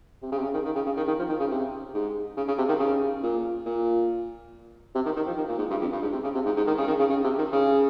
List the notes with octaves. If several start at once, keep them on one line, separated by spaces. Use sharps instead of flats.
C3
C#3
C3
C#3
D#3
D#3
C#3
C#3
D#3
D#3
F3
D#3
C#3
C3
G#2
C#3
C#3
C3
D#3
C#3
A#2
A#2
C3
D#3
D#3
F3
D#3
A#2
G#2
G2
F2
G2
G#2
C3
C#3
C3
G#2
G#2
D#3
C#3
D#3
C#3
C#3
C3
D#3
C#3